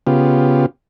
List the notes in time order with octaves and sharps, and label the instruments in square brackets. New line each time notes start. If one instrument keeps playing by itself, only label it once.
[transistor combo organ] C#3 B3 F4 G4